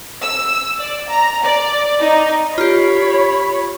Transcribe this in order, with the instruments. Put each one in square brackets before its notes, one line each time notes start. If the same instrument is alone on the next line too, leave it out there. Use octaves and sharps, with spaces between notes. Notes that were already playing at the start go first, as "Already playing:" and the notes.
[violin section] E6
D5
A#5
D5
D#4
[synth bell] F4 G4 [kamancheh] C#5 B5